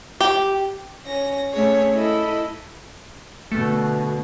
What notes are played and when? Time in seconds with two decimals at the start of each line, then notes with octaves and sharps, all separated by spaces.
0.21 G4
1.07 C#4 A#6
1.54 A3 C#4 G#4 C#5
1.93 E4 A4 D#5 B5
3.52 B2 D3 A3